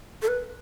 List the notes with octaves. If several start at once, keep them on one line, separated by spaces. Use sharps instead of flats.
A4
B4